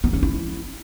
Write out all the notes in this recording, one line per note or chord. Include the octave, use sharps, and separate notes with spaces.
B3
C#4
E4